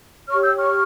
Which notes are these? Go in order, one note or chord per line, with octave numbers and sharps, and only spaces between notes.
G4 C#5 C#6 F6
E6 G6
C#6 F6